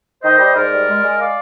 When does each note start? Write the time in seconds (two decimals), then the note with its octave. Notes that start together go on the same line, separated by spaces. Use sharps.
0.23 D#3 C5 D#5
0.39 G3
0.55 G#2 A#4 D5
0.71 G3
0.88 G#3
1.03 G#3
1.20 D5 F5